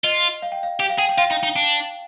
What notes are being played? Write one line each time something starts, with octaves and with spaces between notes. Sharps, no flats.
F4 D#5
F5
G5
F5
G4 G5
F5
G#4 G5
G5
F4 F5
D#4
D#4
D4